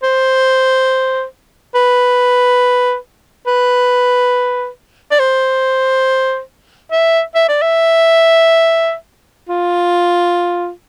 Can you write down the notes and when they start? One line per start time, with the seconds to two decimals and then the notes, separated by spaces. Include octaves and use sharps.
0.03 C5
1.75 B4
3.47 B4
5.11 D5
5.19 C5
6.91 E5
7.35 E5
7.49 D5
7.62 E5
9.49 F4